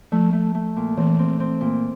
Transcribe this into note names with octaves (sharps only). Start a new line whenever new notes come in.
F3 A3
A3
A3
A#2
E3 C4
C4
C4
A#2